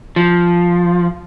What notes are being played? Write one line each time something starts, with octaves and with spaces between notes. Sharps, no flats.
F3